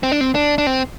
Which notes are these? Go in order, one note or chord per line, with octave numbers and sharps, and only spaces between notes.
C4
D4
C4
D4
D4
C4